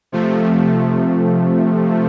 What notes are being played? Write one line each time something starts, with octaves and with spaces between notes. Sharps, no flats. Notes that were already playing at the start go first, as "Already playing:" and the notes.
C3 F3 A3